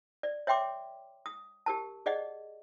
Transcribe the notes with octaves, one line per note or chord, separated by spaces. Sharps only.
D5
C#5 E5 G5 C6 D6
D#6
G4 A#4 A5
G#4 D5 D#5 F#5